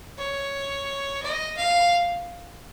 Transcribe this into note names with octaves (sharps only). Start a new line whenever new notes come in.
C#5
D#5
F5